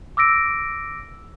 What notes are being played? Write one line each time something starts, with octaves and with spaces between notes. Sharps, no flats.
D6 E6 A#6 D7